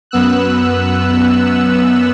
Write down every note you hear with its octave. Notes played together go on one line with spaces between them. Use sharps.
F#2 B3 E6 F#6